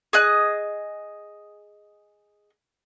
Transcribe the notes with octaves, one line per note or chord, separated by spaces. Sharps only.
G#4 D#5 F#6